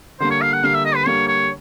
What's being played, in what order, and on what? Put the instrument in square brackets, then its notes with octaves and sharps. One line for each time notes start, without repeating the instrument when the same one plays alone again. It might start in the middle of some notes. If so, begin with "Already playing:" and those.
[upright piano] D3 G3 A#3 [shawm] C5
[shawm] C#5
F5
F#5
[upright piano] D3 G3 A#3 [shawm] F5
[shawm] E5
D#5
B4
[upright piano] D3 G3 A#3 [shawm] C#5
[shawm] C#5